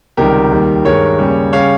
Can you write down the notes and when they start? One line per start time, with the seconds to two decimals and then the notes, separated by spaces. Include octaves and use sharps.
0.17 C#2 C3 D#3 G3 G4 A#4
0.51 D#2 D#3 G3
0.85 G2 D#3 G#3 A#4 C#5
1.19 D#2 C#3 G3
1.53 C#3 G3 C#5 F5